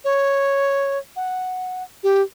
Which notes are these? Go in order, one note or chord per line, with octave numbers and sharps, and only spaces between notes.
C#5
F#5
G4